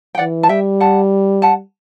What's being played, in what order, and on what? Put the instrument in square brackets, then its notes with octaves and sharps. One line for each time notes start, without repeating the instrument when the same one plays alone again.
[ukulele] G5
[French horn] E3 [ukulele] D5 F#5
[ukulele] A5
[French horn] G3 [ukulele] E5 G5
[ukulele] F#5 A5
F#5 A5